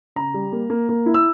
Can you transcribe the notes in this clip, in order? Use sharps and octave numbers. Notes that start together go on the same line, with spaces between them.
C#3 A#5
G3
A#3
A#3
A#3
E4
E6